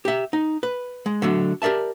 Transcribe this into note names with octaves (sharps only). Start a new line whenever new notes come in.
G4 E5
D#4
B4
G#3
D3 F#3 A3
G4 A#4 D5 E5 A5